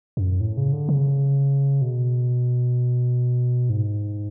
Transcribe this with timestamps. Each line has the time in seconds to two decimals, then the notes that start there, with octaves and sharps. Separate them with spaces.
0.17 F#2
0.41 A2
0.57 C#3
0.73 D3
0.89 C#3
1.82 B2
3.70 G#2